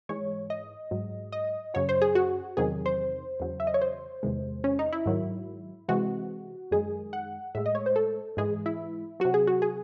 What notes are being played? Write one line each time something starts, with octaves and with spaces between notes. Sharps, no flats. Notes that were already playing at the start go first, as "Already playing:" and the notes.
G#2 E3 G#3 C#5
D#5
G#2 F#3
D#5
F#2 C#3 F#3 C#5
C5
G#4
F#4
E2 C3 D#3 F#3 G#4
C5
E2 C#3 F#3
E5
D#5
C#5
C5
E2 C3 D#3 G#3
C#4
D#4
E4
G#2 D#3 F#3
C3 E3 G#3 F#4
F#2 D#3 G#3 G#4
F#5
A2 G#3 E5
D#5
C#5
C5
A4
G#2 E3 G#3 G#4
E4
C3 F#3 F#4
G#4
F#4
G#4